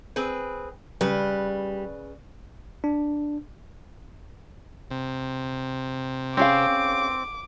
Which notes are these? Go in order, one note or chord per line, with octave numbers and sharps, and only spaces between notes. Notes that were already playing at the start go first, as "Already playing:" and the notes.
C4 G#4 B4
C#3 G3 B4
D4
C3
C4 C#4 G#4 F5 D6